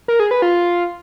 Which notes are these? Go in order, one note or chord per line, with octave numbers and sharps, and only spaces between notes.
A#4
G#4
B4
F4